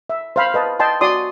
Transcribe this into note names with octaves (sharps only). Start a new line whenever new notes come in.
E5
C5 F5 B5
B4 D#5 A5
D#5 G5 A5 C6
F#4 D5 C6 D#6